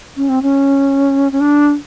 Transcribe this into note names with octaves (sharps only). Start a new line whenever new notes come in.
C#4
C4
C#4
C#4
D4